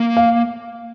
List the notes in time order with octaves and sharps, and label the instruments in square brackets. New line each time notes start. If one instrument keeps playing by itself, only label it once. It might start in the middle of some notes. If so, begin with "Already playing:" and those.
Already playing: [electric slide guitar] A#3
[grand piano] F5